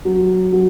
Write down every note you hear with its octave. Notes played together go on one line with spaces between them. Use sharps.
F#3
F#3